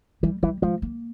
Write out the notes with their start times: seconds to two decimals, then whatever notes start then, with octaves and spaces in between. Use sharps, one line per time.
0.23 E3 G3
0.43 E3 G3
0.62 F3 G#3
0.82 A#3